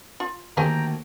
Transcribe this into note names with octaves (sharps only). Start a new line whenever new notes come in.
F4
D2 D#3 A#3 G4 C5 G5 G#5 A#5